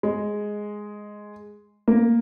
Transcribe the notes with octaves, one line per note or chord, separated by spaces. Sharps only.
G#3
A#3